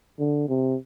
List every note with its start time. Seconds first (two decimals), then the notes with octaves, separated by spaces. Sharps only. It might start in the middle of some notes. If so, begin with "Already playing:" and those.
0.19 D3
0.49 C3